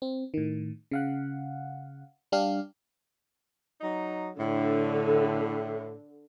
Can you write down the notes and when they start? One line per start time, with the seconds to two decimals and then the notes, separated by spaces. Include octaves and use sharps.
0.02 C4
0.34 A2 D#3
0.91 C#3 F5 F#5
2.32 G3 D4 G4 F5
3.81 F#3 D#4
4.39 A2 D3